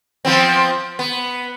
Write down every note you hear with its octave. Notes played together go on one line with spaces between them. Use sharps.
F3 B3 C4
B3